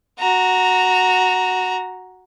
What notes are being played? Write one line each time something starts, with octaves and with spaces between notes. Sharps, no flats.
F#4 A#5